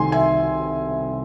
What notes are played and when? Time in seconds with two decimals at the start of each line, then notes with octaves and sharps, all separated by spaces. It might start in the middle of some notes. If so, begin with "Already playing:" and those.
Already playing: C2 C3 D#3 A3 G#5 C6
0.12 E5 G#5